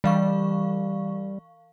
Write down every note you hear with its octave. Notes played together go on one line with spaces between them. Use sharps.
E3 G3 F5 C#6